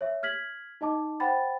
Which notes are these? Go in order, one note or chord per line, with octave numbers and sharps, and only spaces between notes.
C#5 E5
F6 G#6 B6 F#7
D#4 D#5 A5 D6
C5 F#5 G5 B5 A6